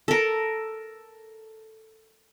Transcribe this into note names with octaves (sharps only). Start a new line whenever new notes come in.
A4 A#4